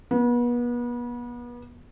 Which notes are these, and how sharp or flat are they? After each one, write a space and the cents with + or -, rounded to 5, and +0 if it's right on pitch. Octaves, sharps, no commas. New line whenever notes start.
B3 -35